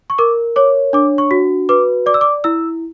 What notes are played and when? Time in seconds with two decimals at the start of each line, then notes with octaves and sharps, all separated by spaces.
0.10 C#6
0.18 A#4 D6
0.56 C#5 D6
0.93 D4 D6
1.18 C#6
1.31 F#4
1.69 B4 D6
2.06 D5 D6
2.14 E6
2.21 D6
2.44 E4 E6